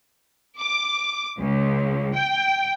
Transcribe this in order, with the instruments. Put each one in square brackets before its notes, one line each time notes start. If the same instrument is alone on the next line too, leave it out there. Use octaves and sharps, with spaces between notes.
[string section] D6
C#2
G5